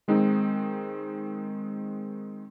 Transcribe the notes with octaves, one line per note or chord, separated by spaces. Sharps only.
D#3 G#3 C4 D#4